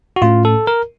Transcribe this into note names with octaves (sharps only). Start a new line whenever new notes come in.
F#4
A2 A3 C#4 F4
A4
A#4